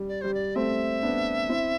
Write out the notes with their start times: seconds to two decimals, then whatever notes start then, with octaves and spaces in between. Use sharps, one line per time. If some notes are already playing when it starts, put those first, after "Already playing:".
Already playing: G3
0.08 D5
0.21 G3 C5
0.34 D5
0.56 A3 C4 E5
1.03 B3 D4
1.49 C4 E4